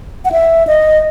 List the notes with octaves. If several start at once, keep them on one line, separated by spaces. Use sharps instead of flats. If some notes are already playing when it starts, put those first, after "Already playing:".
F#5
E5
D#5